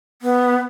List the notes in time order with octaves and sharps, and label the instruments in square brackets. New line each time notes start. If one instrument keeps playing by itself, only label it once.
[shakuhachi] B3